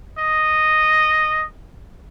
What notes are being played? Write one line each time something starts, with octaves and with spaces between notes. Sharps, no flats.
D#5